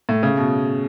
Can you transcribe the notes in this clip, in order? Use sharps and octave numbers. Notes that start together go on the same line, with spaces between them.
A2
C#3
B2